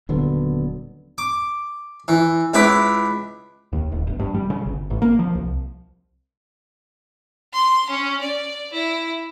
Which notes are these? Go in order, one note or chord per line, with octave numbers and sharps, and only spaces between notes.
D#1 D3 F#3 B3
D6
E3
C#2 E4 B4 B5 D6
D#2
D1
G1
G2
G3
C#3
G1
A1
A#3
F3
C2
C6
C#4
D5
E4